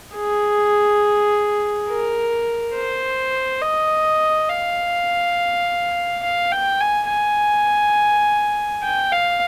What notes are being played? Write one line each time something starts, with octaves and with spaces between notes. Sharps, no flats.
G#4
A#4
C5
D#5
F5
F5
G5
G#5
G#5
G5
F5